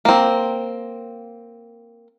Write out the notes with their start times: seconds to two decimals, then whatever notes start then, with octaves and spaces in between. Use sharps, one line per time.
0.05 A#3 C4